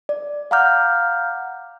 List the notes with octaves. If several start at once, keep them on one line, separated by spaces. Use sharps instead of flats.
D5
F5 F#5 A#5 D6 F6 G6